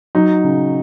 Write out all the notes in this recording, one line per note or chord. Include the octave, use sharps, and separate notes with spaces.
F#3 D#4
C#3